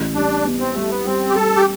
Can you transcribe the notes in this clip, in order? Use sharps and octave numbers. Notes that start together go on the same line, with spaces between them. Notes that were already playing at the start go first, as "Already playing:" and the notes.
Already playing: A1
G3 D4
B3
C4
G3 A3
B3
G3 C4
G4
G3 A4
G4